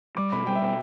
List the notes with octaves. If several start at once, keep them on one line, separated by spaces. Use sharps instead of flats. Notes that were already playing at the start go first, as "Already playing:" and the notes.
G3 D6
B2 B5
G3 G5
E5
B2 G5